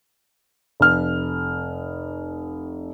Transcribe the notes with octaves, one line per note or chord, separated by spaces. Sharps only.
F1 F6